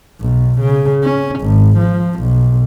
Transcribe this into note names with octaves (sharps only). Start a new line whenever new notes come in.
B1
C#3
C#4
G#1
F3
B1